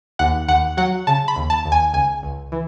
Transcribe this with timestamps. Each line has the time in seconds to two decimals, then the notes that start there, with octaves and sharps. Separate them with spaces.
0.19 D#2 F#5
0.48 D#2 F#5
0.77 F#3 F#5
1.07 C#3 A5
1.28 B5
1.36 D#2
1.50 A5
1.65 D#2
1.72 G#5
1.93 C#2 G#5
2.23 C#2
2.52 E3